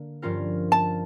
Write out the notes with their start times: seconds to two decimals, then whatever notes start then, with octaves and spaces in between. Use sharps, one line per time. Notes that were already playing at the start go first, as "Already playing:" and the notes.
Already playing: D3 A#3
0.22 G2 F3 C#4 F4 A#4
0.72 A5